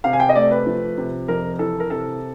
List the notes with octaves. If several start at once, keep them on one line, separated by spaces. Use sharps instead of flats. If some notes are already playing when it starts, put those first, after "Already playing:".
C3 F5
G#5
G5
D#5
A3 D5
B4
F3
C3
F2 A#4
E3 A4
A#4
C3 A4